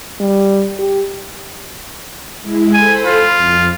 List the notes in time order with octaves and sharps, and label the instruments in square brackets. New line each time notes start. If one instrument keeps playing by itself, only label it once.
[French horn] G3
G4
[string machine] G#3 E4
[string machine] A4 C5 B5 [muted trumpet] G#5
[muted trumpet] F4
[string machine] F2